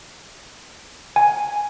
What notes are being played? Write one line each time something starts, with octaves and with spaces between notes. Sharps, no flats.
G#5